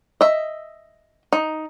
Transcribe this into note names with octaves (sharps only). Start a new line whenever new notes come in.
D#5 E5
D#4